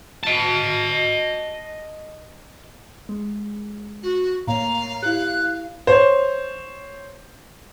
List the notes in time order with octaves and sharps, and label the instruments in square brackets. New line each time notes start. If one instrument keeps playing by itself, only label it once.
[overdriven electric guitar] D#5 A5
[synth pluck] G#3
[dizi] F#4
[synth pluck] A2 A#3 C#5 [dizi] F5 [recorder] A#5
[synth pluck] E4 G4 [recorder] F#6
[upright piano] C5 C#5